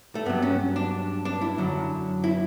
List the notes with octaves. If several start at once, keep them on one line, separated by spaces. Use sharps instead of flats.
A3
G2 F#3 B3
C#4
D4
D4
E4
F#2 D3 F#3
E4